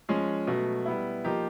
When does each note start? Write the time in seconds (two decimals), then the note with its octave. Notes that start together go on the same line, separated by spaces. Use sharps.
0.09 F3 G#3 C#4
0.47 B2 F#3 A3
0.86 G3 B3 E4
1.24 F3 A#3 D#4 G4